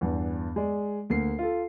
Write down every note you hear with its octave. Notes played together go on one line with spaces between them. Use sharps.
E2 G2
G#3 D5
D2 A#3 C7
F4 A4